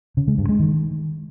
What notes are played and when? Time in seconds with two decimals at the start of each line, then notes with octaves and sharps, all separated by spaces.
0.17 C#3
0.28 G#3
0.38 G2
0.49 G#3
0.60 D#3